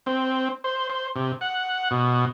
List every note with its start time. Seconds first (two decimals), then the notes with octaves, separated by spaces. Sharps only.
0.06 C4
0.64 C5
0.90 C5
1.16 C3
1.41 F#5
1.91 B2